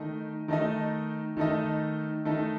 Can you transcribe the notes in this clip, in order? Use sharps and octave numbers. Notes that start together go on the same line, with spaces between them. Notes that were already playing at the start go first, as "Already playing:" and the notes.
Already playing: D#3 A3 D#4 D#5
D#3 A3 D#4 A4 D#5
D#3 A3 D#4 A4 D#5
D#3 A3 D#4 A4 D#5